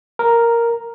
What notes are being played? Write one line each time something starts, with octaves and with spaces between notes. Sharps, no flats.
A#4